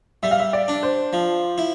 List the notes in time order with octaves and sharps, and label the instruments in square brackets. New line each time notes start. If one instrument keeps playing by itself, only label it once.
[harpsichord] G3 [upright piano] E5
[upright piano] F5
E5
D5
[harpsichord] D4
[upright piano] C5
[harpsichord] F3
E4